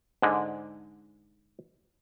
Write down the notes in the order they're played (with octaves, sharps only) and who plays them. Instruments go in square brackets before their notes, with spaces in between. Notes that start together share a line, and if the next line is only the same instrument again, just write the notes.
[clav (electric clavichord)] G#2 D3 G#3